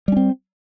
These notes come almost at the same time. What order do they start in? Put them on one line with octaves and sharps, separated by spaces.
G3 C#4 C4